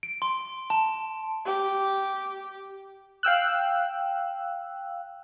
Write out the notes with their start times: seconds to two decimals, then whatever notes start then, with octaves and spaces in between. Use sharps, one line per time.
0.03 D7
0.22 C6
0.70 A5
1.45 G4
3.23 F5 G5 E6 F#6